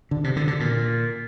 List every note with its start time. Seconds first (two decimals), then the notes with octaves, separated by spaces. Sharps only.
0.11 D3
0.24 C3
0.36 D3
0.48 D3
0.60 A#2